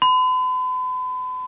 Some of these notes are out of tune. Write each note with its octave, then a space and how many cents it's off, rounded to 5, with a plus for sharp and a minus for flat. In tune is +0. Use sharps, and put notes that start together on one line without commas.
B5 +45